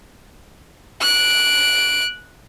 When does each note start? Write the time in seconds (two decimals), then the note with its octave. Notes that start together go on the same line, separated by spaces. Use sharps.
1.01 F#6 D7